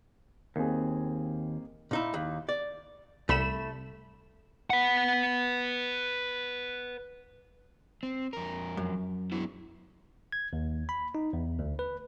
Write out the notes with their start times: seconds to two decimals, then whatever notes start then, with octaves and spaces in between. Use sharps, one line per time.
0.56 D#2 A#3 C4 G#4
1.91 A#2 D#4 E4
2.14 D#2
2.49 D5
3.29 C2 A3 B5 E7
4.70 B4 F#5
8.03 C4
8.33 F2 A#4
8.77 F#2
9.32 B3 E4 F#4
10.32 G#6
10.53 D#2
10.89 B5
11.15 D#4
11.33 E2
11.59 D2
11.79 B4